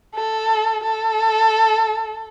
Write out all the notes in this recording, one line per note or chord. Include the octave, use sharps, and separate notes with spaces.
A4
A4